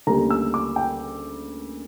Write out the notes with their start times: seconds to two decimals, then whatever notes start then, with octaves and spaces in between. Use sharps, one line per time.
0.07 D2 C#3 G3 A#3 A#5
0.30 E6
0.54 D6
0.76 G5